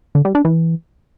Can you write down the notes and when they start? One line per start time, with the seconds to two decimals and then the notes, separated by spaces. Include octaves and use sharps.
0.15 D3
0.25 G3
0.35 D4
0.45 E3